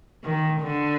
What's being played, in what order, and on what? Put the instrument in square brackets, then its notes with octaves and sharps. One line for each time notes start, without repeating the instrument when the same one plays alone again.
[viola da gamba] D#3
D3